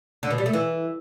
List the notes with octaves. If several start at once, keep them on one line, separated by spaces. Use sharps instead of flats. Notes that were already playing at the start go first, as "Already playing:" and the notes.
D3
B2
G3
A3
E3